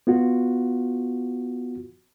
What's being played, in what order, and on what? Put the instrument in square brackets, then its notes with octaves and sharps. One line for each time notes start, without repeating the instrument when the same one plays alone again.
[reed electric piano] B3 F4 F#4